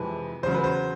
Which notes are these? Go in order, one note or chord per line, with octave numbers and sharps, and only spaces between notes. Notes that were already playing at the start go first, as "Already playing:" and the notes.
Already playing: F2 C3 E3 G#3 B4
E2 C#3 F#3 C5
B4
C5